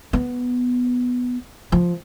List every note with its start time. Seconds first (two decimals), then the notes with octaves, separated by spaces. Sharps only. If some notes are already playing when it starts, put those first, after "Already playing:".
0.13 B3
1.72 F3